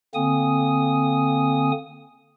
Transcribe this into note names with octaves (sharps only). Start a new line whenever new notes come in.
D3 A#3 C4 G#5 D#6